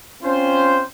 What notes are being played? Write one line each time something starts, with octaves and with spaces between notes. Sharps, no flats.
C4 C#4 F4 C5